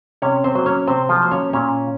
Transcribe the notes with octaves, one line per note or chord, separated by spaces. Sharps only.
C3 C#4 C#5
C4 C5
F#3 A#3 C5
C#4 C#5
C3 C4 C5
F3 F4
F#3 A#3 C5
C#4 C#5
A#2 C#4 C#5